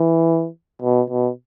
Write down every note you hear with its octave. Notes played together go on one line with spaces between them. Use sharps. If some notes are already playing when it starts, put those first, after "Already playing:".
Already playing: E3
B2
B2